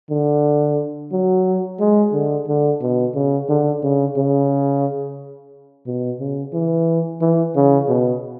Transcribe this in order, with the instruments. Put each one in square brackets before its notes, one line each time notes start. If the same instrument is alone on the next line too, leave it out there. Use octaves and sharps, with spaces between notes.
[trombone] D3
F#3
G#3
D3
D3
B2
C#3
D3
C#3
C#3
B2
C#3
E3
E3
C#3
B2